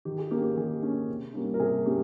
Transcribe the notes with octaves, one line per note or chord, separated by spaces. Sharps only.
D#3 G4
G#4
A#3 C#4 G4
G4
D#3 G#4
A#3 C#4
C3
G3 A#3 C#4
A#4
C3 G#4
G3 A#3 C#4 G4